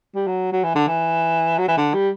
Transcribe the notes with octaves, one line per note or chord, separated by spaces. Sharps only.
G3
F#3
F#3
E3
D3
E3
F#3
E3
D3
G3